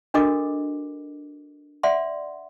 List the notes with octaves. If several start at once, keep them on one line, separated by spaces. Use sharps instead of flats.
D4 F#4 A4 A#4 D#5 D6
D5 E5 F#5 C6